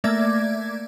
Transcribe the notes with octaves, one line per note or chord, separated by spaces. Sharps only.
A3 A#3 D5 E5 D6 G#6